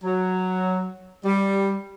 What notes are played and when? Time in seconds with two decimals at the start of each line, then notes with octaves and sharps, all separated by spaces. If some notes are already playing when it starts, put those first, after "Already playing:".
0.04 F#3
1.25 G3